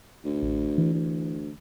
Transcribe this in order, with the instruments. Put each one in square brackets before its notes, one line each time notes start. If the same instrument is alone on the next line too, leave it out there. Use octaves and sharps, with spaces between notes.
[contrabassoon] D2
[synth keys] A1
E3
[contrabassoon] D2